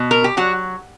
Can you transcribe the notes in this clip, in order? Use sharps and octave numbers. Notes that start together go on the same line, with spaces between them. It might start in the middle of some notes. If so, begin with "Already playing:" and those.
Already playing: B2
A#4
G4
F#3 F#4